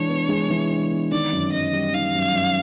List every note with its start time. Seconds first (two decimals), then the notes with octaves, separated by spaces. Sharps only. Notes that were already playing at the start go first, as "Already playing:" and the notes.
Already playing: E3 G#3 D4 C#5
0.09 B3
0.29 G#3
0.50 E3
0.70 D4
0.91 B3
1.12 D#3 D5
1.33 F#2
1.52 F#2 D#5
1.73 G3
1.93 D#3 F5
2.15 F#2
2.35 F#2